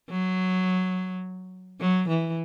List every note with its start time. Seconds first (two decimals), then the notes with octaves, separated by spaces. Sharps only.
0.10 F#3
1.80 F#3
2.08 E3